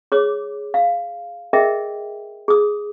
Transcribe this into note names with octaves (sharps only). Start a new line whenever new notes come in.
G#4 C#5 D6
F5
G#4 A#4 D#5 E5 G5
G#4 D#6